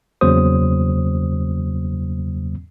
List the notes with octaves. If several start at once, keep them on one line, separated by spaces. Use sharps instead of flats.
E2 C#3 F#3 A#3 C5 D#6